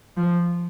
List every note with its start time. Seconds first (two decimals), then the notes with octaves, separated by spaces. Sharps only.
0.17 F3